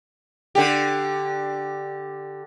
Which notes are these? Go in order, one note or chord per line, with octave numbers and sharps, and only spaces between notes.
D3 G4